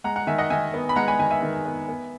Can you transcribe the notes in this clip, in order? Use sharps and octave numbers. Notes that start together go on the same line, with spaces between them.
G#3 F#5 A#5
F#5 A#5
D#3 E5 G#5
D#5 F#5
D#3 E5 G#5
B3
B5
G#3 F#5 A#5
G#5 B5
D#3 G#5 B5
E5 G#5
D#3
B3
B3